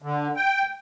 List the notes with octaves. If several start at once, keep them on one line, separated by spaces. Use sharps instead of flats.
D3
G5